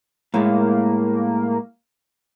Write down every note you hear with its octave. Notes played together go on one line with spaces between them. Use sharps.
A2 G#3 A#3